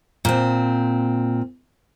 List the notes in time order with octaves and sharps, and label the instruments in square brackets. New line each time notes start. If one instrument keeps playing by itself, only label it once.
[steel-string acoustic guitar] A#2 C4